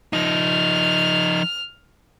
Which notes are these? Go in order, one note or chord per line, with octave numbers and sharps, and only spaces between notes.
F3 D#4 F6